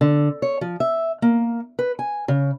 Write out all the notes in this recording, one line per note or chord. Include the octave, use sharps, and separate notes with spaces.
D3
C#5
F3
E5
A#3
B4
G#5
C#3